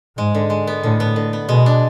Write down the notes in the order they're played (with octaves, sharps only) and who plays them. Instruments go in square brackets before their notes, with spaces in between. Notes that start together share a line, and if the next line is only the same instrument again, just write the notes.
[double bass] G#2 [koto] G#3
[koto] D3
G#3
B3
[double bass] A2 [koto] D3
[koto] B3
D3
B3
[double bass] B2 [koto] G#3
[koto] D4